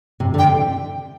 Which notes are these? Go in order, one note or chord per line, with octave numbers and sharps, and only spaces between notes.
C3
D3
G5
C3